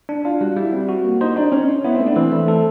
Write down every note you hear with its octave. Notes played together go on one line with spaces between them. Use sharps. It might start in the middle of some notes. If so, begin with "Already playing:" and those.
D4
D4 F4
G3 F#4
G3 E4
C4
F#4
A#3
D#4 C5
D4 D#4
C4 C#4
D#4
B3 E4
C4
A3
D4
E3 C4
A3
A4